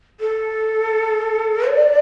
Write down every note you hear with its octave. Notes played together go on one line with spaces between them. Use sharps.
A4
D5